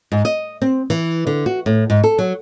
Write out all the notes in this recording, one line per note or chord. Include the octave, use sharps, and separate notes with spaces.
G#2
D#5
C4
E3
D3
F#4
A2
G#2
A4
F#3